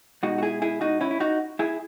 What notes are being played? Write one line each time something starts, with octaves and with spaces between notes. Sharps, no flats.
B2 G#3 D#4 F#4
F#4
E4 G#4
E4 G#4
D#4 F#4
C#4 E4
E4
D#4 F#4
E4 G#4